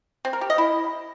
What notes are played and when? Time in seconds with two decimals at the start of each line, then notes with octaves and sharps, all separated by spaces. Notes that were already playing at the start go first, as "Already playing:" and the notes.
0.25 C4
0.33 A#4
0.41 G4
0.50 D#5
0.58 E4